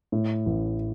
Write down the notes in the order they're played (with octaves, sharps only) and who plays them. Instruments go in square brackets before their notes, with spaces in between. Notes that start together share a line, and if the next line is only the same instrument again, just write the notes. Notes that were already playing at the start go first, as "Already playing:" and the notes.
[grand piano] A2
A1